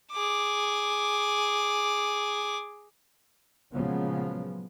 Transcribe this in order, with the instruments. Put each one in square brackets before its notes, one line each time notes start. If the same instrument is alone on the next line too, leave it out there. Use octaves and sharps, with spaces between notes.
[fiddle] G#4 D6
[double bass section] A#2 C#3 F3 F#3 G#3 B3